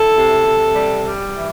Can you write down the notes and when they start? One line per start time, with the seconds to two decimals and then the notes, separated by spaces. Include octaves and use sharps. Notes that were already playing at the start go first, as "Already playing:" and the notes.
Already playing: E4 A4
0.16 C3
0.46 C3
0.75 G3
1.05 G3
1.33 E3